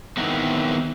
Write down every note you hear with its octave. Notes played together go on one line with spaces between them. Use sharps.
D#3 E3 G#3 B3 C4